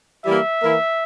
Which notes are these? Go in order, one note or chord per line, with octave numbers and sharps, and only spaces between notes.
E3 G3 A#3 E4 E5
E3 A#3 E4